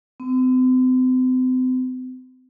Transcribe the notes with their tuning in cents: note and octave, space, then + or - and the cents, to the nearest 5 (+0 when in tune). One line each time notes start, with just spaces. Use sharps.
C4 -40